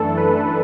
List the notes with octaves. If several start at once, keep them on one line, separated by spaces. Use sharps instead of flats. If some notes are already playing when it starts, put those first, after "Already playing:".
Already playing: F#2 E3 A3 D4 A4
B4
A4